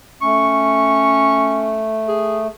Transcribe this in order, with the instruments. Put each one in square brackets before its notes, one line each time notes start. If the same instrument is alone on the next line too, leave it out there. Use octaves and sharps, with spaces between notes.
[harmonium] A3 [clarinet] C#4 [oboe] C#6
[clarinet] G#4